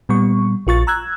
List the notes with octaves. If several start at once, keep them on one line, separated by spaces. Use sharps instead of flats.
A#2 G3 B3 C#6
A#1 F4 C#6 A6
A#5 E6 F#6 G#6